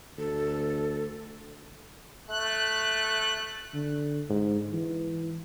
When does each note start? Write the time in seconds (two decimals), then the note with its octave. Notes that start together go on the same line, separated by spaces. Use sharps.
0.18 D2 A4
2.29 A3 F#6
3.74 D3
4.30 G#2
4.73 E3